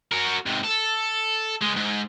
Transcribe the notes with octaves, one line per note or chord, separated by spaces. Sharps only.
F#4 A#4
G#2 C3
A4
C#2 G#3
G#2